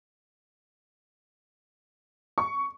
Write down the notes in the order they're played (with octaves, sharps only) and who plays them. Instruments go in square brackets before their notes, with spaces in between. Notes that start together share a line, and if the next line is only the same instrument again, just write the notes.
[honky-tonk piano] C#6